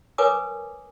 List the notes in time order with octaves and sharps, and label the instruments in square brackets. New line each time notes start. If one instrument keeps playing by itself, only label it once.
[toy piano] A#4 B4 C#5 G#5 D6 D#6